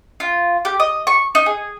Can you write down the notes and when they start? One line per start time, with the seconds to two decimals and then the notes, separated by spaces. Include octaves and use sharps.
0.20 F4
0.65 G4
0.80 D#5
1.07 C#6
1.35 D#4
1.46 G#4